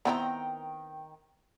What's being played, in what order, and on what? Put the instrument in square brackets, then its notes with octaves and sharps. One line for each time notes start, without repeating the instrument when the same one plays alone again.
[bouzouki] D#3 G5 A#5 [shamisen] B3 C4 E4